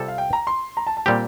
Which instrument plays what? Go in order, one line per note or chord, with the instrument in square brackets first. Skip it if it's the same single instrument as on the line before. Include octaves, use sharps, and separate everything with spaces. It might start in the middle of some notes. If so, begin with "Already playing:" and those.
Already playing: [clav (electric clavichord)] C3 G3 C4 F4 A4
[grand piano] F5
G5
A#5
C6
A#5
A5
A5
[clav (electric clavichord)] A#2 G3 C4 G4 [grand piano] G5